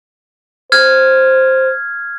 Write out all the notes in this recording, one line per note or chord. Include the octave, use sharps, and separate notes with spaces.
C5 F6 G#6